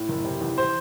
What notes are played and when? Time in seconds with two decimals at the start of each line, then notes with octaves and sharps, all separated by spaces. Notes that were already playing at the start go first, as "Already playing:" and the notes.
Already playing: A2
0.09 F#1
0.25 C3
0.41 E2
0.58 C5